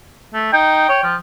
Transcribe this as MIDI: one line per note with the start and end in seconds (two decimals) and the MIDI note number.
0.34 0.52 57
0.53 0.85 63
0.53 1.14 79
0.89 0.98 73
1.03 1.15 53